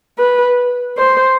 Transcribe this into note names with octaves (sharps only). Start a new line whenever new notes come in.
B4
C5